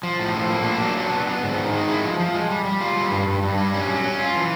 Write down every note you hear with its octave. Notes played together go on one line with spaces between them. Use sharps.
F3
A2
F3
A#3
D4
F#3
D4
B3
B3
G#2
D#3
G#3
E4
F3
F3
G#3
G3
G3
F4
G3
G2
G2
G2
G3
C#4
F#3
C#4
F4
E3